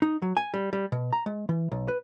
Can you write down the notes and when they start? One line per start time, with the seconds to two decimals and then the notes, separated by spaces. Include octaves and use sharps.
0.02 D#4
0.22 F#3
0.37 G#5
0.54 G3
0.73 G3
0.92 B2
1.13 A#5
1.26 G#3
1.49 E3
1.72 B1
1.88 B4